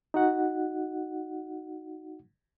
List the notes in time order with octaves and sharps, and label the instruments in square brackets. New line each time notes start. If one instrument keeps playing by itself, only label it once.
[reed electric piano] D#4 F#4 F#5